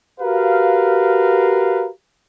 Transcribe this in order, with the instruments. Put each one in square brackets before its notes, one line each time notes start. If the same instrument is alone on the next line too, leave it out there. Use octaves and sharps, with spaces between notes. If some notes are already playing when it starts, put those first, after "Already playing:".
[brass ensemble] F#4 G4 A#4 B4 F5